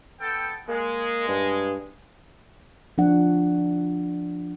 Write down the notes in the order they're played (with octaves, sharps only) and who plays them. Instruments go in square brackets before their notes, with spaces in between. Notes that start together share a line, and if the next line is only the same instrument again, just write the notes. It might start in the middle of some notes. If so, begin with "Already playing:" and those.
[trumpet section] B3 A4 G5
[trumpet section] G#3 [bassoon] A#3
[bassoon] G2
[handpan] F3 D4 F#5